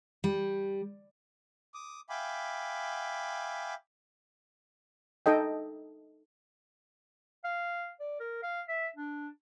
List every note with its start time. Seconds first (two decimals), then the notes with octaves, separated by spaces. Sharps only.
0.24 G3
1.74 D6 D#6
2.09 E5 F5 G5 G#5 B5 D6
5.26 D#4 A4 D#5 G5
7.44 F5
8.00 D5
8.20 A#4
8.43 F5
8.68 E5
8.96 D4